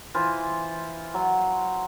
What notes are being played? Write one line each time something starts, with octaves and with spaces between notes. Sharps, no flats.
E3 F4 C5
F#3